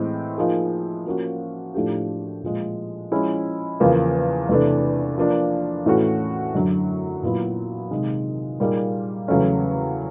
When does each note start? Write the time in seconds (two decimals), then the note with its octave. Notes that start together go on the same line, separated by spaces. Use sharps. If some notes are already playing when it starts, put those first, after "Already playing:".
Already playing: A2 E3 G#3 C4 E4
0.38 F3 A#3 D#4 G#4
1.06 F3 A#3 C#4 F#4
1.74 A2 F3 A3 D4 G4
2.43 A#2 F3 G#3
3.11 F3 G#3 C#4 E4 G#4
3.80 E2 C#3 F3 A#3
4.49 E2 C3 E3 A3 D4
5.18 F3 A#3 D4
5.86 A2 E3 A3 C#4 F#4
6.54 F#2 D3 F#3
7.23 A#2 F#3 B3 E4
7.91 C3 D#3 G#3
8.60 A#2 G3 A#3 D#4 G#4
9.28 E2 C#3 F#3 A3 C#4